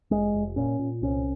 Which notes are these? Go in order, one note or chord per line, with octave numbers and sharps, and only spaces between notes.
F1 G#3
F1
A#2 C#4
A#2
C2 C#4